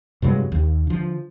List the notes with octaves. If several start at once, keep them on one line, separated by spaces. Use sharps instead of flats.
G2 C3 F#3 G#3
D#2
D3 F3